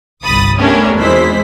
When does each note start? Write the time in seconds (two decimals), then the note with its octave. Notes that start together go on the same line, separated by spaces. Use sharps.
0.25 G1 C2 B5 D#6 A6
0.58 A3 B3 C#4 D4 G4 A#4
0.96 G#1 E2 G#3 E4 C5 B6